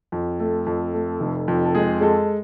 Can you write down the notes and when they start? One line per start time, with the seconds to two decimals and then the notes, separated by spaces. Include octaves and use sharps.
0.12 F2
0.40 A3
0.66 F2
0.94 A3
1.20 F1
1.48 F2
1.65 A4
1.75 G#3 G#4
2.01 G#3 A4